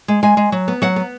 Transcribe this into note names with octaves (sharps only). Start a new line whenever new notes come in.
G#3
G#3 G#5
G#3
F#3
B3
F#3 F#5
B3